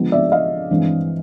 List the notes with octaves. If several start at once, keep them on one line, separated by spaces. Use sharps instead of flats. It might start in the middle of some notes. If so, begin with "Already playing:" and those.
Already playing: D3 F3 G#3 B3
D5 E5
D#5 F5
G2 E3 G#3 C4